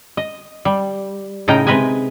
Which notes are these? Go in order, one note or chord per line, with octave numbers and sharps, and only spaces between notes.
D#5
G3
A2 C#3 D#4 A#4 D#5 G5
C3 G#3 B4 D#5 G#5